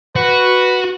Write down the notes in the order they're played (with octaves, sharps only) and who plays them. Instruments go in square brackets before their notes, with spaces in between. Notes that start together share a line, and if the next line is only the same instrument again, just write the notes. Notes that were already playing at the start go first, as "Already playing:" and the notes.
[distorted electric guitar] F#4 [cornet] B4